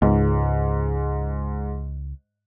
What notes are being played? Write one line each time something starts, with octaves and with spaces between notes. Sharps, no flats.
C#2 G#2